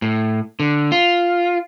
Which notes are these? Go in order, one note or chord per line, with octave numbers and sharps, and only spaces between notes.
A2
D3
F4